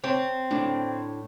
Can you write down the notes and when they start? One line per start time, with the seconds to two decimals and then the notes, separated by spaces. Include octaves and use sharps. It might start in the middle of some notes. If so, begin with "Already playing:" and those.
0.04 C4 C#5 A5
0.51 A2 D4